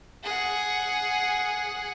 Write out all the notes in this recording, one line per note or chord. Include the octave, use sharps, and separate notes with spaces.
G#4 F#5